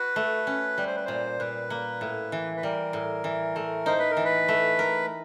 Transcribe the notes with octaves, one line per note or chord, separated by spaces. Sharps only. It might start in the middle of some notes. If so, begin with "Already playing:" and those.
Already playing: F#4 B4
A3
C#4
G3
C5
B4
A#2 C5
A#2 B4
A#3
A2
E3
B4
G3 A#4
A2
E3
A3
D#4 C5
B4
A#4
E3
B4
A3
A#4